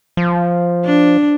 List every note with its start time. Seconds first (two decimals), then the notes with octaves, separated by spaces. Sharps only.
0.17 F3
0.85 D4